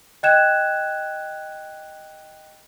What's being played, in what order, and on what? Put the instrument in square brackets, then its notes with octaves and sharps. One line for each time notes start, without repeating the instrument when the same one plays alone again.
[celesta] D#5 G5 F#6 G#6 E7